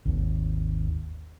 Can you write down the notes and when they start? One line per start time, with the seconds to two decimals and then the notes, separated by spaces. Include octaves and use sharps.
0.05 G#1 D#2